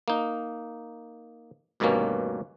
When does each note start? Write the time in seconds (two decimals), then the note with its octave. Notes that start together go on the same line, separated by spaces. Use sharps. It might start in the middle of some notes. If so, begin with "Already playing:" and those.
0.08 A#3 D#4
1.80 D2 G2 B2 D#3 A#3 C#4